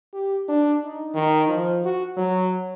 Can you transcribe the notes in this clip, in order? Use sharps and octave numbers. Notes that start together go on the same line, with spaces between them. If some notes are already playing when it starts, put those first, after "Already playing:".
G4
D4
D#4
D#3
F3
F#4
F#3